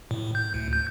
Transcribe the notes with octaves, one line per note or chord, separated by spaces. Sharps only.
A2
G6
D2
G6